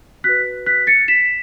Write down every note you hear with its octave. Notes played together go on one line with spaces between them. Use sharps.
F#4 B4 F#6 B6
F#6 B6
A6 C#7
B6 E7